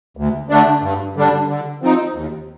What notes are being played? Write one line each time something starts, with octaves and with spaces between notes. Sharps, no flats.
D2
D3 A3 D4
G2
D3 G3 D4
D3
F3 C4 D#4
D#2